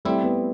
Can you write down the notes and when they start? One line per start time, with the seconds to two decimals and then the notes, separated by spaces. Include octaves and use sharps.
0.05 G3 A3 C4 E4
0.23 B3